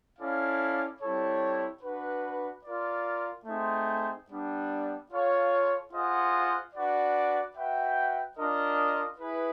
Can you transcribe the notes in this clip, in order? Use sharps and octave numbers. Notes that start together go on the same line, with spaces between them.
C#4 E4 A4 D5 F5
G3 C4 E4 A4 C#5
D4 F#4 B4
F4 A#4 D5
A3 C4 D#4 G#4 C5
G3 B3 D4
F4 A4 C#5 F5
F4 G#4 C5 D#5 F#5
D4 F#4 B4 D5
F#4 B4 E5 G5
D4 F4 A#4 D#5
E4 G#4 B4